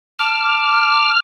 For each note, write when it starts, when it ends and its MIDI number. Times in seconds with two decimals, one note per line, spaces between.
0.19 1.13 81
0.19 1.11 86
0.19 1.20 89